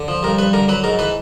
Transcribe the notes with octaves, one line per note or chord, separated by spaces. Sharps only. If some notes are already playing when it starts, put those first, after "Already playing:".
Already playing: D3
F3
G2 A#4
G2 B4
D3 A#4
F#3 B4
G#2 A#4
E3 B4